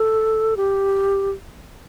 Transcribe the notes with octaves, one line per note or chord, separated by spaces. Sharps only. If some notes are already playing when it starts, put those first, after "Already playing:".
Already playing: A4
G4